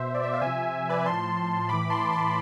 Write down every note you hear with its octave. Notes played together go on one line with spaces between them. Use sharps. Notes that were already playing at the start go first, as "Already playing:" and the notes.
Already playing: B2 C5 E5
D5
E5
F5
C3 F3 E5 G#5
B4 D5
A2 F3 A5 C6
A2 E3 B5 D6
A5 C6
A5 C6